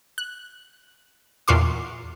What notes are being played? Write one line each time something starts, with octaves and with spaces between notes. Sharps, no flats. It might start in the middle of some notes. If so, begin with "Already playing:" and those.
F#6
E2 A#2 F4 F#4 C6 D6